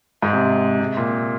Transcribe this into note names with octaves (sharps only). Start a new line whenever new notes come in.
G#2
C3
C3
A#2